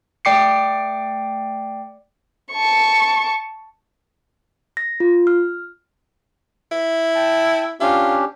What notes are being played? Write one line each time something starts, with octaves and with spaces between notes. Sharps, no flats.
A3 D5 G5 D6 C7 C#7
A5 C#6
A#6
F4
F6
E4
G5 A5
C#4 D4 F4 G4